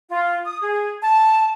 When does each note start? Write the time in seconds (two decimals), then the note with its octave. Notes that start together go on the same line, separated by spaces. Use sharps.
0.08 F4
0.45 D#6
0.60 G#4
1.01 A5